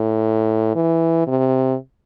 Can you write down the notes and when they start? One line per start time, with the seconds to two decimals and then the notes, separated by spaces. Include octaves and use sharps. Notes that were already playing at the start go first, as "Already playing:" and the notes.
Already playing: A2
0.75 E3
1.27 C3